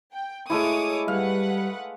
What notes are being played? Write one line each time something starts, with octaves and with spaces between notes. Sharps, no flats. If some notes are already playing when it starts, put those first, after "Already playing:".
G5
G#3 A3 E4 C#5 D6 D#6
G3 B4 F5 F#5